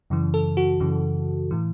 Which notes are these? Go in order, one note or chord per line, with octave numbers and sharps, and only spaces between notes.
F#2 C#3 E3
A4
F#4
F#2 C#3 E3
A2 E3